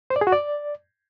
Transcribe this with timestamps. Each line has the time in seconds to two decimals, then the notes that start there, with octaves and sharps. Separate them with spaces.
0.10 C5
0.16 D5
0.21 G#4
0.27 F#4
0.32 D5